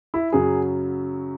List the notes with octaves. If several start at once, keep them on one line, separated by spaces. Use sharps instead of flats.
E4
F#2 C#3 F#3 G#4